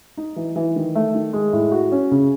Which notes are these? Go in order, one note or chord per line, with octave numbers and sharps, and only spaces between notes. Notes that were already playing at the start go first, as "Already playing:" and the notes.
D#4
E3
E3
D#3
A3
D#3
G#3
A2
F#4
C#4
C#3